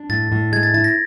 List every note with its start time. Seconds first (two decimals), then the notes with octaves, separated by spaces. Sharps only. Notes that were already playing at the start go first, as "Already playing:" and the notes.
Already playing: D4
0.09 A2 A6
0.32 A2
0.52 G#3 G#6
0.63 A6
0.74 E4 A6
0.84 A#6